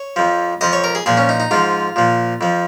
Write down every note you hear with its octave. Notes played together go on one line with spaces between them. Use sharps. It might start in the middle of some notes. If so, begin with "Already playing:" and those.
Already playing: C#5
F2 F3
F2 F3 D#5
C#5
A#4
G#4
A#2 F3 G#4
C#4
D#4
D#4
G#2 F3 F4
A#2 F3
F2 F3